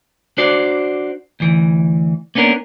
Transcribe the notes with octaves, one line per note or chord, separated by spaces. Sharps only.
D4 F#4 C5 D5
D2 E3
A#3 B3 C#4 D4 A#4